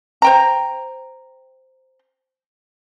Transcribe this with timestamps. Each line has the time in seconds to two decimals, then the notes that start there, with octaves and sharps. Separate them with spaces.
0.22 C5 G5 A#5